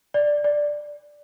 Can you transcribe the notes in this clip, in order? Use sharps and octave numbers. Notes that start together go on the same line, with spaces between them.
D5
D5